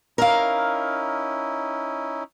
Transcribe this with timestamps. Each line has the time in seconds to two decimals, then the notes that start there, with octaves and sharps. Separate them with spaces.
0.18 C#4 D#4 E4 A#4 F5